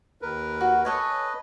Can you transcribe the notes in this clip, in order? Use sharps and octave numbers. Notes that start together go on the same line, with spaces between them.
D#2 A#4 B4
F#4
A4 B4 C#5 D#5 G#5